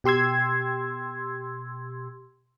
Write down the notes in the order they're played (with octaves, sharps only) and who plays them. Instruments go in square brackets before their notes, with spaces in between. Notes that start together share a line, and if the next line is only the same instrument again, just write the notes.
[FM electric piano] B2 G4 C6 E6 G#6